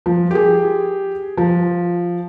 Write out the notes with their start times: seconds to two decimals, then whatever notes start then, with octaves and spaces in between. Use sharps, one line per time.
0.06 F3
0.31 G4 G#4
1.37 F3